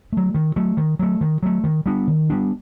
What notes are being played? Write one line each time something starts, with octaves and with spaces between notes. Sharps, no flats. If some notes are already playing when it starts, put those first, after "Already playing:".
F#3 A3
D#3
F#3 A3
D#3
F#3 A3
D#3
F#3 A3
D#3
G3 B3 D4
D#3
G3 B3 D4